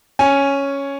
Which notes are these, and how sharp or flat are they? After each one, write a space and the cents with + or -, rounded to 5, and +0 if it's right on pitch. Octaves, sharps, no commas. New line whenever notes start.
C#4 +0 G#5 +0